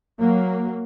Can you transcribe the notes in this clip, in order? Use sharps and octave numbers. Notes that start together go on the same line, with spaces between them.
F#3 A#3